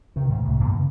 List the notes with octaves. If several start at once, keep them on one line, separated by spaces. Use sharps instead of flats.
C3 D#3
D2 G#2
C2 A2
G2 B2 D#3 A#3
C#3